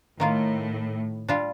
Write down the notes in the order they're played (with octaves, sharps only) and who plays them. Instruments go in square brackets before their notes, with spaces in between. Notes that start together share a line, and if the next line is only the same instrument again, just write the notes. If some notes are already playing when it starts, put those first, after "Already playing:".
[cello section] A2 [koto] D#3 A#3 F4
[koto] G3 D4 F4